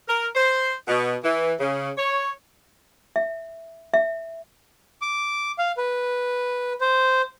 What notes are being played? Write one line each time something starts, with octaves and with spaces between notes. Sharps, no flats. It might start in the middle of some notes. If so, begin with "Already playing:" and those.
A#4
C5
B2
E3
C#3
C#5
E5
E5
D6
F5
B4
C5